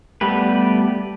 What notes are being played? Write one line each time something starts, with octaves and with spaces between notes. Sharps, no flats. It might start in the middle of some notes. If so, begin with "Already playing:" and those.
G3 A3 B3 G4 B4